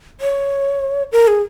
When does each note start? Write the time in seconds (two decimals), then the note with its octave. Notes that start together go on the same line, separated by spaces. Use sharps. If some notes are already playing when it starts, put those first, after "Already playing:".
0.21 C#5
1.12 A#4
1.27 G#4